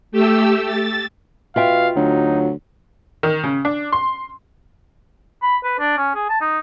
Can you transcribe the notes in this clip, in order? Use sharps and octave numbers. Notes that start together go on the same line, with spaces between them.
A3 G4 E6
A6
B2 F4 E5 F5 G5
D2 F#3 D#4
D#3
C#3
D4
C6
B5
B4
D4
C#4
G#4
A5
D#4